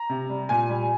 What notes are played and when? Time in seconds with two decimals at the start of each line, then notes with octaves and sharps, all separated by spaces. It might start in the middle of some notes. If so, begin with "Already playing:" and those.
Already playing: A#5
0.10 C3
0.30 G3
0.49 A#2 G#5
0.70 G3